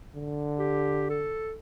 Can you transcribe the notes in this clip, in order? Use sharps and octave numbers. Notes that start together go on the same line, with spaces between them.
D3
G4
A4